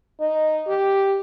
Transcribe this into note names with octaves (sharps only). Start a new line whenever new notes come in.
D#4
G4